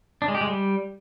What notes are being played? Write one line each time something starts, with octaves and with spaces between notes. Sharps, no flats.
D4
G#3
G4
G#3
G3